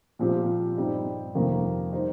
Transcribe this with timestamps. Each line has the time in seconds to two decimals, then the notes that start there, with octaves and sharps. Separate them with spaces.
0.19 A#2 F3 C4 G4
0.76 G2 G3 C4 D#4
1.35 F2 C3 D#3 A#3
1.92 G3 D#4 C5